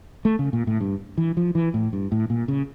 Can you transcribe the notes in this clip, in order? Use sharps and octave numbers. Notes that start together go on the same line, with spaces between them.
A3
C#3
A#2
A2
G2
E3
F3
E3
A2
G2
A2
A#2
C#3